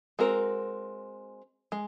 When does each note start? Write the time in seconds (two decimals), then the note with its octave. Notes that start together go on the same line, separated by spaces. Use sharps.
0.19 G#3 C4 F#4 A#4
1.72 G#3